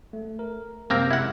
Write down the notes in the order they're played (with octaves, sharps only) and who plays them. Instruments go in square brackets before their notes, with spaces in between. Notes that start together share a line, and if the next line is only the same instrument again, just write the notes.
[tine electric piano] A3
A#4
[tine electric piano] F#2 C3 G#3 [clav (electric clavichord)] A#3 C4 A#4
[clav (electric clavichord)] E4 F#5